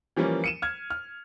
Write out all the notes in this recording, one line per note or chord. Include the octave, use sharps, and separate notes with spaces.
E3 F3 G3 A#3 C#4
C#7 D#7 E7
F6 G#6
F6